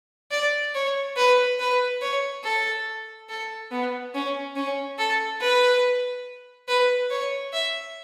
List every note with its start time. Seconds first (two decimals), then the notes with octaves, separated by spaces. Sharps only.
0.31 D5
0.74 C#5
1.16 B4
1.59 B4
2.01 C#5
2.43 A4
3.29 A4
3.71 B3
4.14 C#4
4.56 C#4
4.98 A4
5.40 B4
6.68 B4
7.10 C#5
7.53 E5